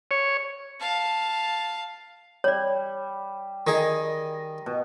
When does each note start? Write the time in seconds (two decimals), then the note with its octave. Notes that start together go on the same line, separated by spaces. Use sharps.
0.11 C#5
0.80 F5 A5
2.44 G3 C#5 D5
3.67 D#3 G#4 D#5
4.66 B2